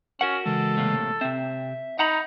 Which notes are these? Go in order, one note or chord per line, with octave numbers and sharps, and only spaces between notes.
C#4 F#4 A#4 F#5
C#3 E3 G#3 A4
A2 C3 A#3
C3 C4 E5
D#4 F#5 A#5 B5